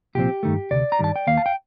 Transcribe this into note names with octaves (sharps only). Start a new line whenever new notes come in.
C2 A#2 F3 C4 G4
G2 D#3 A3
D2 C3 D5
A#5
G2 D#3 G3 A5
G5
D#2 D#3 A#3 F5
A5
G5